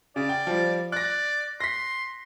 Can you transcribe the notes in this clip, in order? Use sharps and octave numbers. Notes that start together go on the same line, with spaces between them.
C#3 D5
G5
F3 G3
D5 F#6 A#6
C6 A#6 B6